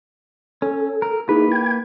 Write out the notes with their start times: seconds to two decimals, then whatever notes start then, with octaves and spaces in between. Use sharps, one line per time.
0.62 C#4 A4
1.02 A#4
1.29 A#3 D#4 E4 G#4 B4
1.52 G5 G#6